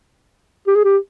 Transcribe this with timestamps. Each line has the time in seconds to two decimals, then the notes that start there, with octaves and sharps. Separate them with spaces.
0.68 G4
0.76 G#4
0.84 G4